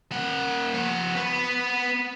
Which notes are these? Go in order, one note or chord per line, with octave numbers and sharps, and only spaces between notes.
A#3 F#5
F3 F#5
B3 B4